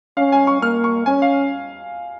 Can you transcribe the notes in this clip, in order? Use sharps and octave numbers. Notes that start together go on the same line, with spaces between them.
C#4 F5
G#5
C#6
A#3 F6
C#6
C#4 G#5
F5